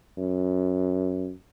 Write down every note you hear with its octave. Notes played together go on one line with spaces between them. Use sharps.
F#2